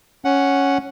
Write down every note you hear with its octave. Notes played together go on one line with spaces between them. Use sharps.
C#4 F#5